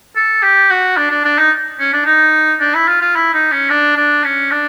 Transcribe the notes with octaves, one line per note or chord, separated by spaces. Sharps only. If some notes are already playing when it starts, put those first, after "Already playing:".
A4
G4
F#4
D4
D4
D4
D#4
C#4
D4
D#4
D4
E4
F4
F4
E4
D#4
C#4
D4
D4
C#4
D4